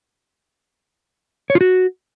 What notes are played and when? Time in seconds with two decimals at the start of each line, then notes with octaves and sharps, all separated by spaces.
1.50 C#5
1.55 F4
1.61 F#4